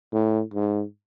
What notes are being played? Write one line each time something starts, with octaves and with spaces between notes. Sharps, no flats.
A2
G#2